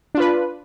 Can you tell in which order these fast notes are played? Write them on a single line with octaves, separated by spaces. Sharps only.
D4 F4 B4